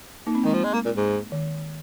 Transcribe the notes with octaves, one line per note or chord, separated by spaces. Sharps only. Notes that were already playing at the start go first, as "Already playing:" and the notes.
A#3 D#4
C4
D#3 G#3
F3
G#3
A#3
A#2
G#2
D#3